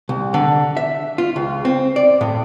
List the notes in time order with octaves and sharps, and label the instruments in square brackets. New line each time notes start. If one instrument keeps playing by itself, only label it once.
[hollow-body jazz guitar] C2
D3
E5
F4
C#2
C4
D5
A2